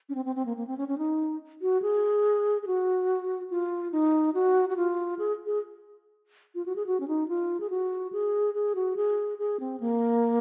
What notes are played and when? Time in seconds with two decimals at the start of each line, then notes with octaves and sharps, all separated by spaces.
0.09 C#4
0.15 C4
0.25 C4
0.36 C4
0.46 A#3
0.57 A#3
0.67 C4
0.78 C#4
0.88 C#4
0.98 D#4
1.62 F#4
1.82 G#4
2.63 G#4
2.67 F#4
3.50 F4
3.92 D#4
4.34 F#4
4.69 F#4
4.77 F4
5.19 G#4
5.46 G#4
6.55 F4
6.66 F#4
6.76 G#4
6.87 F#4
7.00 C#4
7.08 D#4
7.28 F4
7.60 G#4
7.70 F#4
8.12 G#4
8.54 G#4
8.75 F#4
8.97 G#4
9.39 G#4
9.60 C4
9.80 A#3